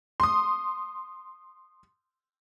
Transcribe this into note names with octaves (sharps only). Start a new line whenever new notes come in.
C6 D#6